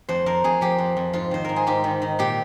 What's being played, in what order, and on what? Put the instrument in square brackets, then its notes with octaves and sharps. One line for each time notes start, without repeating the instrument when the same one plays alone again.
[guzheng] F2 C5
F2 A#4
F2 G#4
F3 G4
F2
F2
G#2 F4
D#3 C5
G#2 A#4
G#4
G#2 G4
D#3
D#3
A#2 G4